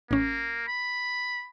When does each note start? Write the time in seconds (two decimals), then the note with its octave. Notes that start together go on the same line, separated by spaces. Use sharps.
0.11 A1 A#3 C#4
0.68 B5